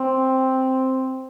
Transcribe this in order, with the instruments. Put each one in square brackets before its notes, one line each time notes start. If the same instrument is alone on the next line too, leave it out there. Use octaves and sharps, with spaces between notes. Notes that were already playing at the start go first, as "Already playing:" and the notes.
Already playing: [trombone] C4